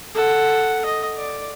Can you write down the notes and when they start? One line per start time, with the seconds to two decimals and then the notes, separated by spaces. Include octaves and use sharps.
0.14 A4 F#5
0.85 D#5
1.17 D5